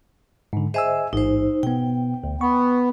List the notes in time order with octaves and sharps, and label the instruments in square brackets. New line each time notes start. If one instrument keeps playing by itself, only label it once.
[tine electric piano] G#2 D3
[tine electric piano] G#4 G#5 E6 [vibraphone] C5 D#5 E5
[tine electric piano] A1 G#2 [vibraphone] D#4 C5
[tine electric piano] B2 B3 [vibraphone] G5
[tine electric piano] D2
[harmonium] B3 [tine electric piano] C#6